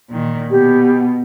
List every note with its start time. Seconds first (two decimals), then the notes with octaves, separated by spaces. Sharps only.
0.11 A#2 D#3
0.50 B2 G4